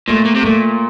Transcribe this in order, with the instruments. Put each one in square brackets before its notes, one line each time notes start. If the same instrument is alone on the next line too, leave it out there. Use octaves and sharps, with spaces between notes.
[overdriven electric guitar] A#2 [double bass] A3
[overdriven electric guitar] A#2
C3
[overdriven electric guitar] A#2 [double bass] A3